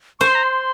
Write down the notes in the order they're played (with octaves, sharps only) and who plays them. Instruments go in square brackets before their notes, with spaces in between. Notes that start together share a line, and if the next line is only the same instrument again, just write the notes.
[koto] C5 [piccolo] C#6
[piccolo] C6
A#5
C6